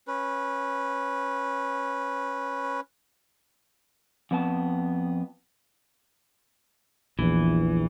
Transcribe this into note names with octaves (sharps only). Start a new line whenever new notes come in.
C#4 B4
F2 B3 A5
A#1 E2 E3